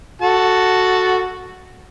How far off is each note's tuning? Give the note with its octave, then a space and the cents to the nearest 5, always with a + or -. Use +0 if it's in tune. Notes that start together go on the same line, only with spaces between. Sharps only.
F#4 +0 A4 +0 A5 +0